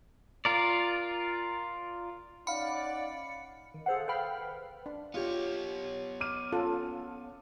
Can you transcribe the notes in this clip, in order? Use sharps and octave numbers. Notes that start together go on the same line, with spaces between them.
F4 A#4 D5
C#4 D#4 D5 F5 F#5 B5 C#7
D#3
G#4 A4 C5 F5 F#5
B4 C5 F5 G5 B5 F6
D4
B3 F4 G4 C#5
D6 F6 D#7
C#4 F4 A4